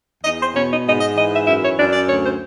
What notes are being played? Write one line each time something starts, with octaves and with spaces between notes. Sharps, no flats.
E2 D#5
C5
B2 C#5
D#5
G#2 D#5
D#5
E3 D#5
E5
F#2 E5
C#5
F#2 D5
D5
D2 C#5
C5